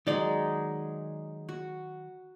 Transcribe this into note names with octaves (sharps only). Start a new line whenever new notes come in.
D#3 F#3 G#3 D#4 D5
F#4